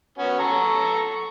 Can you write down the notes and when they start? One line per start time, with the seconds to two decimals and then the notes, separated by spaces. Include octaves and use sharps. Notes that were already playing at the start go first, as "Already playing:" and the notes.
0.18 B3 C#4 F#4
0.39 A4 A#5 C#6